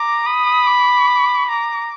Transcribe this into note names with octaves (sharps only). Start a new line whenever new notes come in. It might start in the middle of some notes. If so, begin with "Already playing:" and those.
Already playing: A#5 D6
B5 D#6
D6
A#5 D6